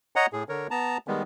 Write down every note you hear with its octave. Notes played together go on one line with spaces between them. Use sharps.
C#5 D#5 F#5 A#5
A2 G#4
D3 A#4 C#5
B3 A5 A#5
D#3 G3 G#3 B3